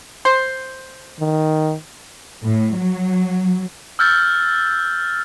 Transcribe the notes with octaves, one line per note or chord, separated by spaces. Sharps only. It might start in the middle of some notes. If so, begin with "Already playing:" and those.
C5
D#3
A2
F#3
E6 F6 G6 A6